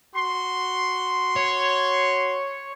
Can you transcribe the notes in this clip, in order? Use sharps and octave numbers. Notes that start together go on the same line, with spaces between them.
F#4 C6
C#5